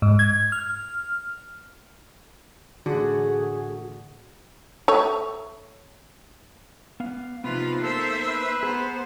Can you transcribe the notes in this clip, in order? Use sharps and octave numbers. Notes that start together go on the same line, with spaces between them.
G#2
G#6
F6
A1 D3 A3 F#4 G#4 F#5
A3 C#5
B3 F5
C3 F3 B3 D#4 F4 B4
A#3 A4 C5 E5
B4
B3 G#4 C5 A#5